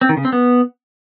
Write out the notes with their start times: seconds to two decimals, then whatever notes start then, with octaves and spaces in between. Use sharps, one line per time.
0.01 C4
0.09 D#3
0.17 C#3
0.25 C4
0.32 B3